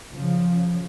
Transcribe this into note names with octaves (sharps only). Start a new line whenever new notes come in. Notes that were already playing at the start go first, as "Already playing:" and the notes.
C#3 F3